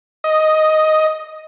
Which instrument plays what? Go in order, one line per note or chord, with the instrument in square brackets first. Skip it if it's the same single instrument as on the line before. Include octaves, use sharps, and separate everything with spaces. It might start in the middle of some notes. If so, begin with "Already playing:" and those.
[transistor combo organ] D#5